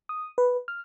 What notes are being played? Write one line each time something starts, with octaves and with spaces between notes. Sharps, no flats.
D#6
B4
F6